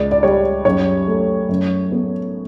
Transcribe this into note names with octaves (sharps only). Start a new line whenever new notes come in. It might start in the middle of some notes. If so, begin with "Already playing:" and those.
Already playing: C#2 D5
D5
G3 C#5
F#2 C#5
A3
F#2
B3